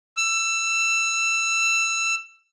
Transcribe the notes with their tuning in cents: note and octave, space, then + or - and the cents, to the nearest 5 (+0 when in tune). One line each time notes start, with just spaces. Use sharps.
E6 +20